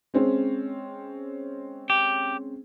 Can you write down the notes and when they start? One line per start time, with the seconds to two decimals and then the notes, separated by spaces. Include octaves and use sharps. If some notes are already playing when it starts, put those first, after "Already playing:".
0.14 G#3 C4 C#4
1.90 G4